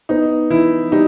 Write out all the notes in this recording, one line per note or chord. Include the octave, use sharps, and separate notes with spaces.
B3 D#4
E3 E4
G3 D#4